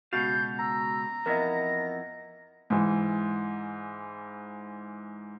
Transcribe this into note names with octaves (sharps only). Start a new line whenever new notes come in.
C#2 B2 F#4 F5 G6 A6
A#5 E6
F2 E3 B3 A#4 D#5 A#6
G#2 E3